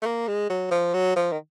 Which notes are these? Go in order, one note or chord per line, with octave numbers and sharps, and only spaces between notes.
A3
A#3
G#3
F#3
F3
F#3
F3
D#3